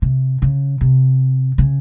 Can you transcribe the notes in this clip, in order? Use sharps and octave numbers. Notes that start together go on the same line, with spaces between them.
C3
C#3
C3
C#3